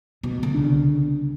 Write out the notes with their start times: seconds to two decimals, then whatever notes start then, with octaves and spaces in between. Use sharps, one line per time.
0.23 B2
0.43 D3
0.54 C2 C#3 D4